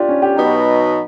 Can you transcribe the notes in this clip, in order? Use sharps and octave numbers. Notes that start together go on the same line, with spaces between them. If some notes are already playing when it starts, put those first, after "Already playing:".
Already playing: D4 F4 G4
C#4
G4
B2 F#3 B3 D#4